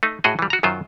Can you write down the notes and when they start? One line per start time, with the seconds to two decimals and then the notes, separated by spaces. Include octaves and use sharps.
0.03 A3 D#4
0.24 A2 F#4 G#4 D#5
0.39 E3 G3
0.50 F#4 A#5
0.63 F#2 D#3 F#3 F4 C5